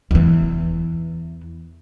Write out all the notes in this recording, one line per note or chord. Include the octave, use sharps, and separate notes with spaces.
E2 E3